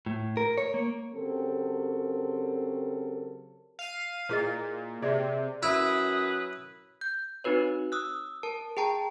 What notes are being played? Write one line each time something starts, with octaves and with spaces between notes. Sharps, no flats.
A2
A#4
C#5
A#3
C#3 F#3 C4 G4 A4 A#4
F5 D#7
A#2 E4 G#4 D#5
C3 G#4 D5 E5
F#2 E4 B4 D#6
G6
C4 D#4 F#4 B4 C#5
D#6 E6 F#6
A#4 A5
G#4 G5 A5 A#5